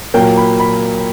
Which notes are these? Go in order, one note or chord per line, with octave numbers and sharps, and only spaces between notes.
A#2 F#3 A#3 G5
B5
B5